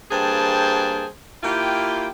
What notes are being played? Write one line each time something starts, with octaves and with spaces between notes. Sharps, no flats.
G2 A#3 G#4 C5 G5 A5
A#3 E4 F4 G4 G5